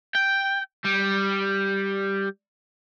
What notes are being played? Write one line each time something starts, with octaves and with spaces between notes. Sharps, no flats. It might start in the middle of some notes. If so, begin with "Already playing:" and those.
G5
G3